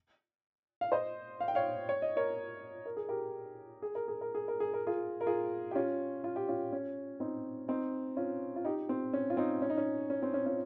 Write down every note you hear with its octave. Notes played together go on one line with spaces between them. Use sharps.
F5
C5 D#5
F5
G5
C#5 F5
C#5
D#5
A#4 C#5
A#4
G#4
G4 A#4
G#4
A#4
G#4
A#4
G#4
A#4
G#4
A#4
F4 G#4
A#4
F4 G#4
G4
C#4 F4
F4
G4
C#4 F4
C#4
C4 D#4
C4 D#4
C#4 F4
F4
D#4 G4
C4
C#4
F4
C4 D#4
C#4
D#4
C#4
C#4
C4
C#4
C#4 F4